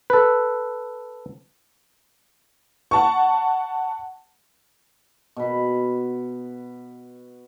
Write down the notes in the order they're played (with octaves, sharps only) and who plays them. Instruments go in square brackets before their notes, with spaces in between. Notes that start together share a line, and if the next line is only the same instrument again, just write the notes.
[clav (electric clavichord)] A4 B4
[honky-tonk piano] F#5 A5 C#6
[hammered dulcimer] B2 B5